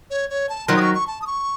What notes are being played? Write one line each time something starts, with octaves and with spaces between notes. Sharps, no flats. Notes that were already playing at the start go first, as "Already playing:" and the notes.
C#5
C#5
A5
D#3 F#3 C6
D#6
C#6
C#6
A5
D#6
C#6